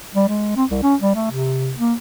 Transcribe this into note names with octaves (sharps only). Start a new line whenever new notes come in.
G3
G#3
C4
C2
C#4
G3
A3
C3
A#3